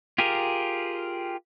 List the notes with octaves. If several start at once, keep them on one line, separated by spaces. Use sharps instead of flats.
F4 G4 G#4 A#4